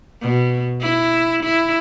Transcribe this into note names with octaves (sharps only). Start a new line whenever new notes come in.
B2
E4
E4